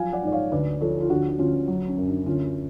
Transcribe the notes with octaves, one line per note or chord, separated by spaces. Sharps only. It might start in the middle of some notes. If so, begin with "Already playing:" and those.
Already playing: F3 F#3 F5 G#5
D5 F#5
G#2 D5
C#5 F5
D2 B4 D5
F3 A4 C#5
F4
D2 D4 F#4
F#4
D2 C#4 F4
F#3
C#4
F#2
D4
D2 C#4 F4